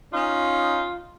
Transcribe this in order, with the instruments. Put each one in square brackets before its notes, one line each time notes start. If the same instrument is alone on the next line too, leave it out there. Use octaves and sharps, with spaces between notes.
[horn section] C#4 D#4 [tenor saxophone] F4